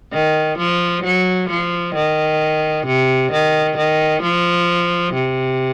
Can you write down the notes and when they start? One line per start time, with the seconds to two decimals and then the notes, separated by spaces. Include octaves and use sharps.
0.13 D#3
0.58 F3
1.04 F#3
1.50 F3
1.95 D#3
2.87 C3
3.32 D#3
3.78 D#3
4.23 F3
5.14 C3